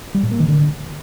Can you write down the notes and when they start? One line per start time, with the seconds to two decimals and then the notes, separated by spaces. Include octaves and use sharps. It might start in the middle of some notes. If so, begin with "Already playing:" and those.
0.15 G3
0.23 A2
0.31 A#3
0.40 D#3
0.48 D3